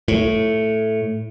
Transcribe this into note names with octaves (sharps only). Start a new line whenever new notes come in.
A2